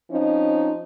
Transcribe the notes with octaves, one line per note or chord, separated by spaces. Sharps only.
F3 C4 C#4 D#4